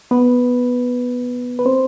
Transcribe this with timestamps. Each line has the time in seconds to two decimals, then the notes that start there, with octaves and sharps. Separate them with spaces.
0.11 B3 B4
1.59 B4
1.65 C4 C5